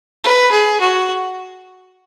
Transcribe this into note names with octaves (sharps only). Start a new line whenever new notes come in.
B4
G#4
F#4